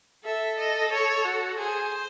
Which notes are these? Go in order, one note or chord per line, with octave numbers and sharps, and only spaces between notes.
A4 E5
D#5
C#5
F#4
G#4 C5